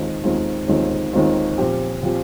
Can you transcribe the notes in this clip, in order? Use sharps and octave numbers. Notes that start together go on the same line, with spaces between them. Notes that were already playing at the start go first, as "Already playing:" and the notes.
Already playing: D#2 D#3 G#3 C4 F4
D#2 D#3 G#3 C4 F4
D#2 D#3 G#3 C4 F4
D#2 D#3 G#3 C4 F4
A#2 F3 C4 G4
A#2 F3 C4 G4